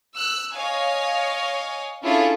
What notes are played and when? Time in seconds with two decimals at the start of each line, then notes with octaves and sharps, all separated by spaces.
0.16 E6 F#6
0.54 C#5 D#5 F5 G#5
2.03 C#4 D4 E4 F4 G#4 A4